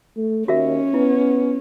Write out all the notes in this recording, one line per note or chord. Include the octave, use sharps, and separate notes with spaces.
A3
D#2 C#4 F#4 A#4 E5
B3 E4